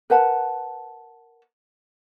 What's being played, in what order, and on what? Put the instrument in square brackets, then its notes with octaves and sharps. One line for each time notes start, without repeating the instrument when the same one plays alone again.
[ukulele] A#4 B4 F#5 A5